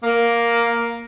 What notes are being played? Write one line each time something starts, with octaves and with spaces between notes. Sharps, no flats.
A#3